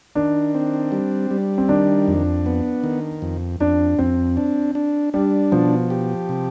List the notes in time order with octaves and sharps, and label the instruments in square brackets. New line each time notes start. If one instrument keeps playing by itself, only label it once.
[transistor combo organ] D#3 [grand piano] D4
[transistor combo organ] C4
G3
G3
[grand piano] C4
[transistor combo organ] D#3 [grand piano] D4
[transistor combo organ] F2
B3
D#3
F2
[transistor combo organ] F2 [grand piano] D4
[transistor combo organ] F2 [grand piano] C4
[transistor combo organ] D4
D4
[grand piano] G3 [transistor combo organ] D4
[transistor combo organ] B2 [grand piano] F3
[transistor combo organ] G4
C3